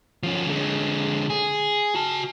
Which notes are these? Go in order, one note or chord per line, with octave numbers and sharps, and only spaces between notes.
F3 C#4
D3 G#3
G#4
F#4 A5